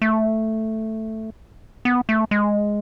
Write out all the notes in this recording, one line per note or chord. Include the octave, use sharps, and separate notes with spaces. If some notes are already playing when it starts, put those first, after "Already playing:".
A3
B3
A3
G#3